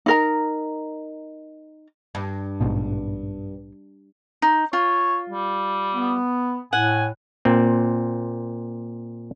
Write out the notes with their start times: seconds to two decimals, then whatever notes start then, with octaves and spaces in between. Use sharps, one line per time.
0.06 D#4 A#4 A#5
2.15 G2
2.61 A#1 G#2 B2
4.42 D#4
4.73 F4 C#5
5.30 G3
5.94 B3
6.73 A2 F#5 G#5
7.45 A#2 C4